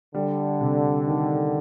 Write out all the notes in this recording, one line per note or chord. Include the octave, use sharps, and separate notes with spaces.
D3 G3
C3
D#3